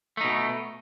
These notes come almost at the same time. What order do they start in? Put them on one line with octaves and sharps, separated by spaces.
A3 D#4 B2